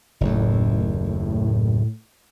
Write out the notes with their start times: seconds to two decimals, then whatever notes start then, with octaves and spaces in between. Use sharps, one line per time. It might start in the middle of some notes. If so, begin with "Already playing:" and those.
0.21 F#1 D#2 A2